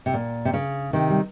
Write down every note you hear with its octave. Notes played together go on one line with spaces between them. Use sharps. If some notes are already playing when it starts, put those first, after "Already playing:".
C3
A#2
C3
C#3
C3 D#3
G3